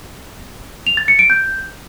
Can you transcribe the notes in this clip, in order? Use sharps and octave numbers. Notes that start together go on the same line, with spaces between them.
F7
A6
C#7
D7
G6